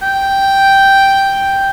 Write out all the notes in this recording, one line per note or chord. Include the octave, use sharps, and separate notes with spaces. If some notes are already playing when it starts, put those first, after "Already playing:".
G5